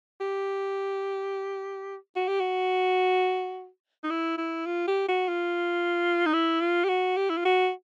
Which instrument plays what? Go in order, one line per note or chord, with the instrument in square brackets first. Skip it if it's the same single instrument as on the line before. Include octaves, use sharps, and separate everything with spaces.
[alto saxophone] G4
F#4
G4
F#4
D#4
E4
E4
F4
G4
F#4
F4
D#4
E4
F4
G4
F#4
G4
E4
F4
F#4